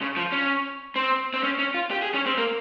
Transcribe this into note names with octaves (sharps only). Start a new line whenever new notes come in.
C#3
F3
C#4
C4
C4
C#4
C#4
F4
G4
G#4
C#4
C4
A#3